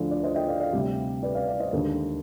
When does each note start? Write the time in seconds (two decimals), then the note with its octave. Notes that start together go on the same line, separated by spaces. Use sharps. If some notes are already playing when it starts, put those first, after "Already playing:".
Already playing: D2 D3 F3 D5
0.11 D5
0.23 C5 D#5
0.35 D#5 G5
0.48 D5 F5
0.60 D5 F5
0.73 D2 C3 G3
1.23 B4 D5
1.35 D5 F5
1.47 D5 F5
1.60 C5 D#5
1.73 D#2 D3 G#3